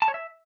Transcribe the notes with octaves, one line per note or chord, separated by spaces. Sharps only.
A5
C#5
E5